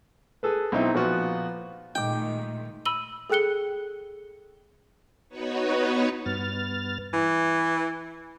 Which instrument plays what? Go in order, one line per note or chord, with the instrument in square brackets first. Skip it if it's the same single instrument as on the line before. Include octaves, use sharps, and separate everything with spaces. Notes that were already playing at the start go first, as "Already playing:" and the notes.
[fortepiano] G#4 A4 B4
B1 C4 D#4 E4
A#2 F3 B3 F4 F#4
[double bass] A#2 [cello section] D#3 G#3 A3 [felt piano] D#4 D6 [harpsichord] G5
[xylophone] B5 E6 D#7 F#7 G7
G#4 A4 G5 F#6 C#7 G7
[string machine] B3 D#4 F#4 B4 C#5
[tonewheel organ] G2 B3 F6 A6
[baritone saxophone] E3